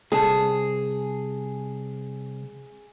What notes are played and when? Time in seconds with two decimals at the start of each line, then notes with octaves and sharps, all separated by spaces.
0.12 C2 G#4 A5